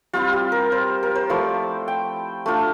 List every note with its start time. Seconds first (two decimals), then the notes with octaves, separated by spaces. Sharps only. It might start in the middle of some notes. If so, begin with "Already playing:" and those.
0.13 G3 C4 E4 F4
0.33 G4
0.52 A#4
0.72 C5
1.03 A#4
1.15 C5
1.29 F3 A3 E4 D5
1.88 G5
2.46 A3 D4 F4